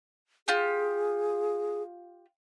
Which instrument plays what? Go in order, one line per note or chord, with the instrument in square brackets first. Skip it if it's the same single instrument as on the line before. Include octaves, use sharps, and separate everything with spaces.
[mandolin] F4 G4 [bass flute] G#4